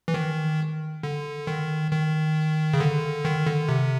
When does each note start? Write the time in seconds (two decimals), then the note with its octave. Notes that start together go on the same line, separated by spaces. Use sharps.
0.08 E3
0.14 D#3
1.03 D3
1.47 D#3
1.91 D#3
2.74 C#3
2.80 D3
3.25 D#3
3.47 D3
3.69 C3